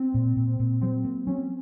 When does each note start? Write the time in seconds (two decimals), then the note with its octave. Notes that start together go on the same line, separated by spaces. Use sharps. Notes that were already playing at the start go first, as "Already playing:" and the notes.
Already playing: C4
0.14 A#2
0.36 A#2
0.60 A#2
0.82 F#3 C4
1.05 A#3
1.27 F#3 C#4